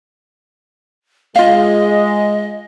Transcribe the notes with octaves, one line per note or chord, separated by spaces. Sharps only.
G#3 F4 D#5 F5